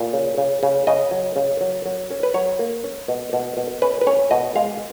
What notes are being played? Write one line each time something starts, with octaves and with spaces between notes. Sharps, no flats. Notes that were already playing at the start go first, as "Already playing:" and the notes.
Already playing: A#2
C#3
C#3
C#3
C#3 D#5
F#3
C#3
F#3
F#3
C#4
B4
F#3 C#5
A#3
C#4
B2
B2
B2
C#4 B4
B4
C#4 C#5
B2 D#5
G#3 F5